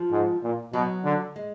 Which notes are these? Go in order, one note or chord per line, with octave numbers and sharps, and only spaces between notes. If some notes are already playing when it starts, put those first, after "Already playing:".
Already playing: F3
G#2
A#2
B2 F#3
D3
G#3